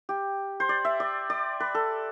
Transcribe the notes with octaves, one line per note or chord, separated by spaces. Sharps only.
G4
C5
D5
E5
D5
D5
B4
A4